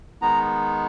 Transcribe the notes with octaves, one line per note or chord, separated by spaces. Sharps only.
D#3 G#3 B3 D#4 A#5